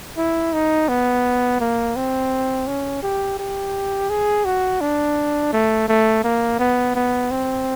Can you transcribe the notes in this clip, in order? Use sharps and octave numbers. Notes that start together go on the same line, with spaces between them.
E4
D#4
B3
A#3
C4
C#4
G4
G4
G#4
F#4
D4
A3
A3
A#3
B3
B3
C4